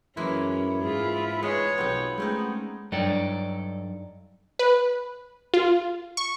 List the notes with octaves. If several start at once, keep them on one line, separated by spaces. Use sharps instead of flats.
F#2 E3 G#3 A#3 C#4 E4
G#2 F4 G#4
G#3 B3 C#5
B1 F3 B3 C4
G#3 A3 C4 C#4 D#4
G2 F#3 D#4 A4 D5 G5
B4
F4
C#6